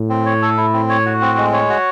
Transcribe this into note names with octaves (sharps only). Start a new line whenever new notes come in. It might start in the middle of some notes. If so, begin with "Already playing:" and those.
Already playing: A2
C4
C#5
A4
E4
C4
C#5
F#4
C4
G#3
C#5
F#4